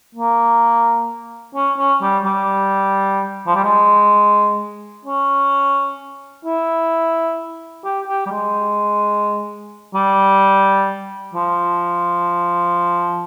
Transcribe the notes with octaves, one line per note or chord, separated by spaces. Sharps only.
A#3
C#4
C#4
G3
G3
F3
G3
G#3
C#4
E4
G4
G4
G3
G#3
G3
F3